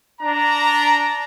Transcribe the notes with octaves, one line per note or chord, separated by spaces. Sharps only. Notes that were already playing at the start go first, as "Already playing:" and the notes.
D4 A#5